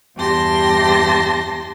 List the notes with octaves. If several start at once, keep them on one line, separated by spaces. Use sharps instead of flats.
E2 G2 G4 A5 C6 A#6